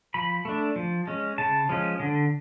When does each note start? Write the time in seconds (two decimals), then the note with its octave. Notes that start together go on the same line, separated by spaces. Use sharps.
0.14 F3 B5
0.45 A3 D4
0.76 F3
1.07 G#3 C#4
1.38 C#3 A5
1.69 F3 G#3 C#4
2.00 D3